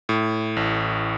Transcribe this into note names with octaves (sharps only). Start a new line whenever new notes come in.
A2
A1